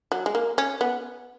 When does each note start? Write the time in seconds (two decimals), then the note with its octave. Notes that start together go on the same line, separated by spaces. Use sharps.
0.12 F#3
0.26 G#3
0.35 A#3
0.58 C#4
0.81 B3